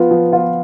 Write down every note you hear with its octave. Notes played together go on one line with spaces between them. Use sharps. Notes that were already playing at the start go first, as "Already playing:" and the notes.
Already playing: F3 B3 F4
F3
B3 F4